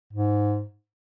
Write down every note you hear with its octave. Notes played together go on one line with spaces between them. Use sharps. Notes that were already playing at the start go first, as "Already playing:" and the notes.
G#2